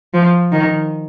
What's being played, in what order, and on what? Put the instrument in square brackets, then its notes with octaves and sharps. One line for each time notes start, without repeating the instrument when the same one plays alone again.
[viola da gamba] F3
D#3